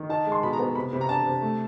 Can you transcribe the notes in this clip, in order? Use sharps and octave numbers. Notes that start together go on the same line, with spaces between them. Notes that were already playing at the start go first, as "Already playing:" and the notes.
Already playing: D#3
D#4 A5
G#3
C6
B2 B5
A#5
B3
C3 B5
C3 B5
A#5
D4 A5
C3
A3